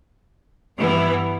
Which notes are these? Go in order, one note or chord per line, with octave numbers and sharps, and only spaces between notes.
G2 E3 G3 B3 E4